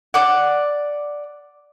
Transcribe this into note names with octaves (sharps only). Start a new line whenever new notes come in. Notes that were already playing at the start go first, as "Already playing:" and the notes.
D5 F#5